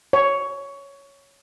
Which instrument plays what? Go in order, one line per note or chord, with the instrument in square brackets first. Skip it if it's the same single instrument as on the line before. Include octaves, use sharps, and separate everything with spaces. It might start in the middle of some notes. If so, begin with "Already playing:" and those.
[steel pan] C#5